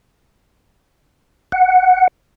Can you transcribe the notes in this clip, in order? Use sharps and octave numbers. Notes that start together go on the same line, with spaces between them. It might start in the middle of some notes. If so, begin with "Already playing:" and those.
F#5